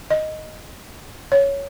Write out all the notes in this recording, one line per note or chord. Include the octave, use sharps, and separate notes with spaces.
D#5
C#5